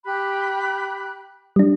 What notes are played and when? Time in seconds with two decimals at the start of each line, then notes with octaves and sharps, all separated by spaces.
0.05 G4 B5 F#6
1.56 G3 D4